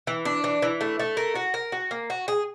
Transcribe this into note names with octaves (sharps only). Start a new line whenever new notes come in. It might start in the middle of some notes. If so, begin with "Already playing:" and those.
E3
D4
E3
E3
A3
A3
A#4
F#4
A#4
F#4
A#3
F#4
G#4